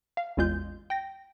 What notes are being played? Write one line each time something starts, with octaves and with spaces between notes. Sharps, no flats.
F5
A1 E2 G#3 F4 G6
G5 A#6